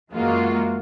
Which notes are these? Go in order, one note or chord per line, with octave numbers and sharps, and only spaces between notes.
F#2 E3 G#3 A#3 F4 F#4